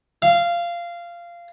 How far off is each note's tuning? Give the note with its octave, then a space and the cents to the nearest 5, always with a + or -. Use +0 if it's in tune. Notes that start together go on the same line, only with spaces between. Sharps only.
F5 -15